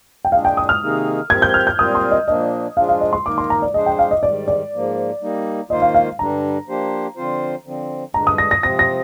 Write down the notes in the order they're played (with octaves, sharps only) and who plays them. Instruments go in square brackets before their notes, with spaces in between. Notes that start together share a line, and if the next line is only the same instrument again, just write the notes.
[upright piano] G5
[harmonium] A#2 G#3 D4 G#4 [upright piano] F5
[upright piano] G5
D#6
F6
[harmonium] C3 D#3 A#3 D#4 G#4
[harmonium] F3 C4 G4 A#4 [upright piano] G#6
[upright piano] G6
F6
G6
[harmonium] A#2 G3 C4 F4 A#4 [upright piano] D#6
[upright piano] C6
D#5
[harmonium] A#2 F3 A#3 D4 [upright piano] D#5
[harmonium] F3 G#3 D4 F4 G#4 [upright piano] F5
[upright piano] F5
D#5
C6
[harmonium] D#3 A#3 D#4 A#4 [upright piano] D6
[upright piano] C6
A#5
D5
[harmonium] F3 G#3 D4 G#4 C5 [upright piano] D#5
[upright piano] G5
F5
D#5
[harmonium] G#2 D#3 G3 [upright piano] D5
[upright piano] D5
[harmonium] G#2 F3 A#3
G3 A#3 D#4
[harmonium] D#3 A#3 F4 C5 [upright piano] D#5
[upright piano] F5
F5
[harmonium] G2 D3 G3 D4 [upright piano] A#5
[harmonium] F3 A#3 D4 G4 C5
D3 F3 C4 F4 C5
D3 F3 C4
[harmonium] G2 D3 G#3 D4 [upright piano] A#5
[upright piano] D#6
A#6
A#6
[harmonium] C3 F3 C4 [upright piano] A#6
[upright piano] A#6